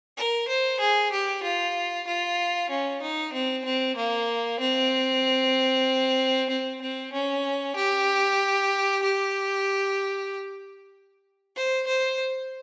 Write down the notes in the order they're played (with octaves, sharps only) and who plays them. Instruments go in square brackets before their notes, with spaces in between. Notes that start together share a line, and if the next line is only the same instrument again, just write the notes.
[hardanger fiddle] A#4
C5
G#4
G4
F4
F4
C#4
D#4
C4
C4
A#3
C4
C4
C4
C#4
G4
G4
C5
C5